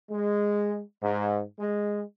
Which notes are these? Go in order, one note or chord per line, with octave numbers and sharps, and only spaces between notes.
G#3
G#2
G#3